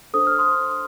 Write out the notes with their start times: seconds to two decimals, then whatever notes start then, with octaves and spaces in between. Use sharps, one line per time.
0.14 D4 A4 C5 D#6
0.27 F6
0.38 C6 D#6